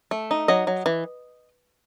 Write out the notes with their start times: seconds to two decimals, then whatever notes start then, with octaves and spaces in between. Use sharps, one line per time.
0.11 A3
0.31 D#4
0.48 F#3 D#5
0.67 F#3
0.86 E3